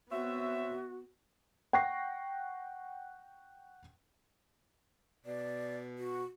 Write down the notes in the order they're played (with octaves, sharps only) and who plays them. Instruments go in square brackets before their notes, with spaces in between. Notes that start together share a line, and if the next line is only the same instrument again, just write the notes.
[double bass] B3 [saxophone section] C4 C#5 E5 [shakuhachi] F#4
[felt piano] F#5 G5 C#6 A#6 C7
[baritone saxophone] B2 [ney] D5
[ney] F#4